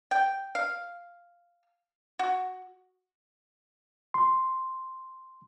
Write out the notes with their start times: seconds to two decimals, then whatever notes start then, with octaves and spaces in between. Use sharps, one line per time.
0.11 G5
0.55 F5
2.19 F#4
4.14 C6